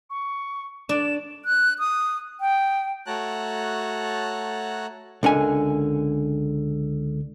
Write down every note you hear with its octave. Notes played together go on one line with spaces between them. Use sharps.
C#6
D4 D5 E7
F#6
D#6
G5
A3 F#4 C#5 A5 A#5 F#6
C#2 D3 A#4 G#5